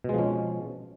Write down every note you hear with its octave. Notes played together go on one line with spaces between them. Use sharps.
B2 F3 G#3 C#4